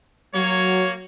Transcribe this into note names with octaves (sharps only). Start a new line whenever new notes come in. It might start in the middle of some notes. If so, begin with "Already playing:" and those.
F#3 A#3 C#5